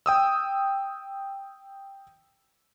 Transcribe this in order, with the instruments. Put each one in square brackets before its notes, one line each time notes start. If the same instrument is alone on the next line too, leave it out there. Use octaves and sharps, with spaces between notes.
[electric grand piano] G5 D#6 E6